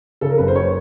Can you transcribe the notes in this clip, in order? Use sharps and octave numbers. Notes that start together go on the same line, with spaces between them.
C#3 A4
A#4
F#1 B4
C5
C#5